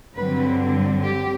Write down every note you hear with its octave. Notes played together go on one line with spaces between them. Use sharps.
G2 D3 F#3 C4 B4
G4